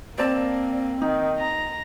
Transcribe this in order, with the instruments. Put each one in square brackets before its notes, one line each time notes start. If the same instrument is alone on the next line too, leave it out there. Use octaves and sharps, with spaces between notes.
[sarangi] A#3 [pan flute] C4 [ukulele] C5 D5 A5
[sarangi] D#3 [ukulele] D#4
[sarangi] A#5